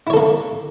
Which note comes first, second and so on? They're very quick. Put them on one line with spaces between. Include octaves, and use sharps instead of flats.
E4 C#5 A4 A#3